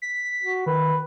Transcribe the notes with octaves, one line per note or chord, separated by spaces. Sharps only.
B6
F#4
D#3 B4